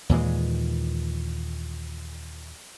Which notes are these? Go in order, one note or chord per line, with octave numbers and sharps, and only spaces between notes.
D#2 A#2 E3 G#3